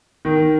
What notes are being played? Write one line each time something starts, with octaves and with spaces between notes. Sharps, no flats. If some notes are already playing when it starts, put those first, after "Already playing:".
D#3